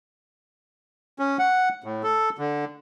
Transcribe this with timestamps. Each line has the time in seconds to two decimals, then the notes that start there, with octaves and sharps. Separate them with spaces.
1.19 C#4
1.39 F#5
1.84 A2
2.03 A4
2.38 D3